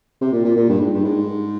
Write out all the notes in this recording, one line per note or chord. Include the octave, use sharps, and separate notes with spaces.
C3
A#2
A#2
A#2
G2
G#2
G2
G#2